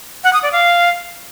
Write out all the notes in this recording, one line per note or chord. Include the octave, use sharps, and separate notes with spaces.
F#5
D#6
D5
F5